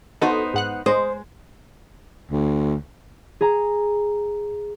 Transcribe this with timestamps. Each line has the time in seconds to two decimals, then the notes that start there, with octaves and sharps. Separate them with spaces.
0.21 B3 D#4 F#4 A4 C5 D#5
0.54 G#2 F#5 F#6
0.86 G#3 C5 D#5
2.31 D2
3.41 G#4 A#5